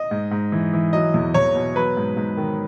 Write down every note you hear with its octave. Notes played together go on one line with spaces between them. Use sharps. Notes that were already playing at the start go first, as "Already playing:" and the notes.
Already playing: D#5
G#2
G#2
E3
E3
F#3 D#5
E2
E2 C#5
B2
F#3 B4
G#2
G#2
D#3